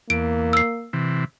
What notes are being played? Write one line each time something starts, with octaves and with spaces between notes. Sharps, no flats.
E2 A#3 D7
E6 C7
C3 E3